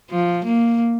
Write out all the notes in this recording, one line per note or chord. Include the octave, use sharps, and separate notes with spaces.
F3
A#3